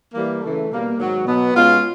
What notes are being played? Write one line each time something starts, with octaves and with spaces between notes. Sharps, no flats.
E3 G3 A#3
C#3 E3 A3
B2 G3 A#3
G#2 D#3 F#3
B2 F#3 B3
B2 G#3 C#4 F4